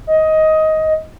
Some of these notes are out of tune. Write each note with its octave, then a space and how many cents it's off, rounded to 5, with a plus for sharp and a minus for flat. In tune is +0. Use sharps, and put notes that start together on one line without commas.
D#5 +15